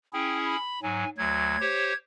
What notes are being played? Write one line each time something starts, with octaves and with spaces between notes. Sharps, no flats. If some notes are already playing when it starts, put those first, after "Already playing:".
C#4 E4 G#4 G5
B5
G#2 F#3 G#5
D2 F#3 G#6
G4 C5 C#5